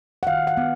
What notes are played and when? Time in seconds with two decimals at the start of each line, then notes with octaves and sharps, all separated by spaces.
0.23 F#5
0.27 D#3 F5
0.47 F#5
0.57 B3